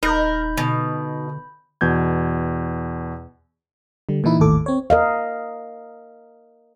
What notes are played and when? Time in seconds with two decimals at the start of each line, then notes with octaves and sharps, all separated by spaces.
0.03 D#1 D#4 A#4 B5 G6
0.57 B2 D3
1.81 E2 B2 G6 G#6
4.09 D3 G3
4.24 A#2 E3 D#4 E4
4.40 G#1 D#2 A2 A4 D6
4.66 C4 C#5
4.90 A#4 D#5 F5